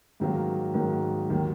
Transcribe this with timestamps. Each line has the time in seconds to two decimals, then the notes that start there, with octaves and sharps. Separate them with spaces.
0.20 G#2 D#3 F#3 A#3
0.74 G#2 D#3 F#3 A#3
1.29 D#2 D#3 F#3